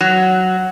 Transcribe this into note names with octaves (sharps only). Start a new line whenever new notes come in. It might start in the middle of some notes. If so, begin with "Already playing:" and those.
F#3